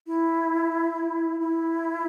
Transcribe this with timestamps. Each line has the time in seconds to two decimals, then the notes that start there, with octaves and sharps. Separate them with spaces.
0.07 E4
1.40 E4